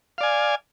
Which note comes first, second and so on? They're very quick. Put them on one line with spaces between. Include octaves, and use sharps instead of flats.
F5 D5 G#5